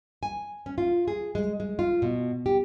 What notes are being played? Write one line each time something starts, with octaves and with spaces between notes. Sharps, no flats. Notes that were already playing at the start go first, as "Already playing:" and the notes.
G#5
C#4
F4
G#4
G#3
G#3
F4
B2
G4